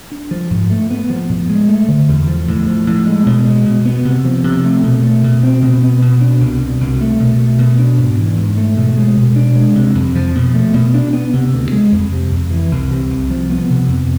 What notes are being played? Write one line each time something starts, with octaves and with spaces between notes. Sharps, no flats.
D4
F3
G#2
A3
B3
F3
A2
G#3
A3
D3
E2
F3
A2
F3
A2
G#3
B2
G#3
B2
B3
C3
F3
C3
A3
B2
A3
B2
C4
B2
B3
B2
D4
C2
B2
C2
A3
B2
A3
B2
D4
G#2
E3
G#2
A3
B2
G#3
B2
D4
G#3
C3
F2
F3
B2
A3
B2
D4
B3
C3
D2
G#3
F2
C3
F2
E3
C2
C3
C2
F3
B3
C3
F2